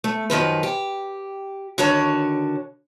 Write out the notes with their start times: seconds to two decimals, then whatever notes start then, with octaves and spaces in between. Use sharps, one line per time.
0.04 A3
0.30 F#2 D#3 F3 B4
0.63 G4
1.78 D3 D#3 F#4 C#5 A5